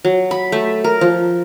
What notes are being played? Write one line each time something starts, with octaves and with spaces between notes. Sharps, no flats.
F#3
B5
A3
A#4
F3